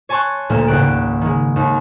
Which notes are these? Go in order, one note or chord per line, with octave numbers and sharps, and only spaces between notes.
C#5 G#5 A5 C6 C#6 F#6
D2 A#2 A3 A#3
G#1 C#2 F#6 D7
D#3 G#3
D#2